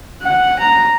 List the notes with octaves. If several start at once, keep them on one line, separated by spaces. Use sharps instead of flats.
F#5
A#5